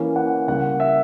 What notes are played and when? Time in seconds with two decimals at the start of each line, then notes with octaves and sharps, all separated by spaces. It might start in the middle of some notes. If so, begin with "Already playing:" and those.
Already playing: E3 A#3 C#4
0.16 F#5
0.47 C#3 G3 A#3 F#5
0.80 E5